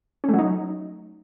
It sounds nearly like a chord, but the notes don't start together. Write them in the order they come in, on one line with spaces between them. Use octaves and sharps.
C#4 A3 F#3 D#4